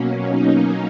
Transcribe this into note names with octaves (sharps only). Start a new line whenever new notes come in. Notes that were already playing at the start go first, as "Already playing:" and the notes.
Already playing: B2 F#3 A#3 C#4
D#4